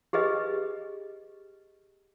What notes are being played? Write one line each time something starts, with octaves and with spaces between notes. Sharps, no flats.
G4 G#4 B4 D#5